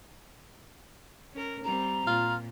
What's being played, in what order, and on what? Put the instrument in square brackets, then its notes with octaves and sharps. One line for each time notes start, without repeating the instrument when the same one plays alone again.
[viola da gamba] C#4 A#4
[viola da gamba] G3 C4 [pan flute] A#5
[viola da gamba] A#2 [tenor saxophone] F4